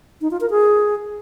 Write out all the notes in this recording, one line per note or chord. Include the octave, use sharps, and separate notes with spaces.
D#4
F4
A#4
G#4